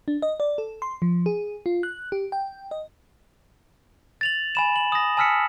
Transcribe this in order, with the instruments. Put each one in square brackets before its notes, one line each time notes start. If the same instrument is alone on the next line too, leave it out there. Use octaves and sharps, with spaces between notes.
[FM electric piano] D4
D#5
D5
A4
C6
F3
G#4
F4
F#6
G4
G5
D#5
[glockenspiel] A6 F7 F#7
G#5 B5 E7
F#7
D#6 A#6
G#5 A5 E6 F6 B6 C#7